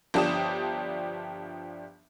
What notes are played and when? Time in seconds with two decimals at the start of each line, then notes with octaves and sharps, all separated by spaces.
0.14 G1 F3 D4 G4 D#6 E7